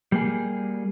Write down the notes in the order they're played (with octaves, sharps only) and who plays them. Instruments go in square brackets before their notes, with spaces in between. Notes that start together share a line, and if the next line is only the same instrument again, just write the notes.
[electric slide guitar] G3 A#3 G#4